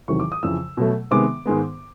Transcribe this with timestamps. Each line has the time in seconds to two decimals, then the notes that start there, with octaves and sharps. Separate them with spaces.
0.08 E2 C3 D#3 F#3 C#6
0.20 D6
0.32 D#6
0.43 F2 C#3 E3 E6
0.77 B2 F#3 A3
1.11 C3 D#3 G#3 B3 D6
1.46 G#2 D#3 G#3 B3